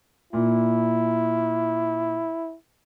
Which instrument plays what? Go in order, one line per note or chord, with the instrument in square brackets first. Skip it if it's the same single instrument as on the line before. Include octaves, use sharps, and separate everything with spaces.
[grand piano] A#2 [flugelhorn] E4